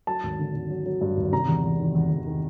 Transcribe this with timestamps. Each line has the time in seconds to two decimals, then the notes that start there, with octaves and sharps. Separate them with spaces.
0.07 F#3 A5
0.23 G#1
0.38 D3
0.54 G#1
0.70 F#3
0.86 F#3
1.01 G2
1.17 G#1
1.32 C3 A#5
1.48 E2
1.63 E2
1.80 D#3
1.95 E2
2.10 E2
2.27 D#3